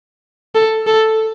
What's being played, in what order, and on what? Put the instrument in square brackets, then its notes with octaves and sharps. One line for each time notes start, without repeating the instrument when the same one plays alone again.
[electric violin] A4
A4